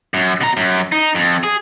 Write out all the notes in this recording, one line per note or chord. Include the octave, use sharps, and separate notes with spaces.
F#2
B2 A#5
F#2
D#4
F2
G#4